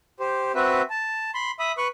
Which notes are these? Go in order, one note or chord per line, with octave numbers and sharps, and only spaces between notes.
G4 C5
C4 F#4 B4 E5
A5
B5 C6
E5 B5 D#6
B4 C#6 F#6